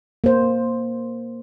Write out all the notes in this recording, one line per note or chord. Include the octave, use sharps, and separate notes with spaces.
A#3 C5